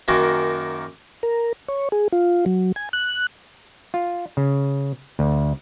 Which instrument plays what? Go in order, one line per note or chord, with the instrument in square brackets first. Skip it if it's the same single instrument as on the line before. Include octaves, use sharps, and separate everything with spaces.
[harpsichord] F#2 D#3 A#3 F#4 G#5
[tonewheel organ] A#4
C#5
G#4
F4
F#3
G#5
F#6
[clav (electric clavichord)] F4
C#3
D2